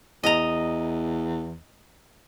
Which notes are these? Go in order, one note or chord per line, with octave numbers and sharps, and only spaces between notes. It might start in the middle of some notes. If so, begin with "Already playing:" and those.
E2 D#5 A#5